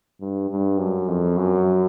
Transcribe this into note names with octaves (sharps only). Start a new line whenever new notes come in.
G2
G2
F#2
F2
F#2